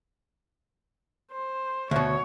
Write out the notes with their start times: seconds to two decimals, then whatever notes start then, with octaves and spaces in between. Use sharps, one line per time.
1.31 C5
1.91 D2 B2 C#5